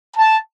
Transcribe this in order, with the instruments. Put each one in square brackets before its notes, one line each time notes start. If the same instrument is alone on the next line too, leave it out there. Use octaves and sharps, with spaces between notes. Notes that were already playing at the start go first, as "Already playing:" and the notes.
[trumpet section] A5